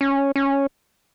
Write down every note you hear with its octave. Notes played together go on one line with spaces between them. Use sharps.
C#4
C#4